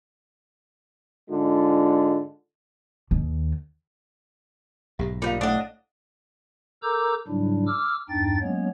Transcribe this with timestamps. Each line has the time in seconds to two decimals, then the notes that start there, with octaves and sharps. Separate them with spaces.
1.30 G#2 D3 G#3 D4 F4
3.11 D#2
4.99 B1 G#2 G4 E5
5.22 A#2 G3 D#4 C5 F5
5.41 A2 D4 D#5 F#5 D6 D#6
6.83 A4 A#4 A#5 D6 E6 G6
7.27 G#2 C#3 F#3 G3 D4 E4
7.67 D6 E6 F6
8.09 E2 G2 D4 D#4 G5 A6
8.41 F#3 G#3 A#3 B3 C#4 C#5